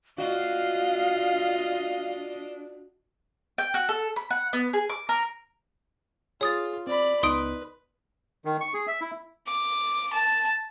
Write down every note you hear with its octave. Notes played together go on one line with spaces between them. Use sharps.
D4 F4 F#4 D#5 F5
G5
F#4
A4
B5
F#5
B3
G#4
D6
A#4
F4 G#4 C#5 D#6 A6
C4 D5 B5
C#2 B3 D#4 B4 C6 D#6 D7
D#3
C#6
G#4
E5
E4
D6
A5